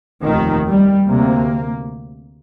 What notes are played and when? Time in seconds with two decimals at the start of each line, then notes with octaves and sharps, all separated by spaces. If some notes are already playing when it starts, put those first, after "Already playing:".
0.25 F1 D#2 D#3
0.67 G3
1.09 D2 C3 A#3